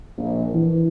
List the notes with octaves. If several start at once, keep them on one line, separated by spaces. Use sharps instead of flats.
A#1
E3